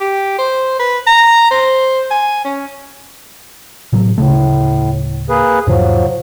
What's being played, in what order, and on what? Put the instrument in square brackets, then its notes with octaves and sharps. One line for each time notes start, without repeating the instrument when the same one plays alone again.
[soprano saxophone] G4
C5
B4
A#5
C5
G#5
C#4
[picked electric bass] A2 C3 F#3
[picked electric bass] D1 C#3 A3 [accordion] A2
[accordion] A#3 G#4 B4
[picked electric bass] E2 G#2 C3 [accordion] F3 F#3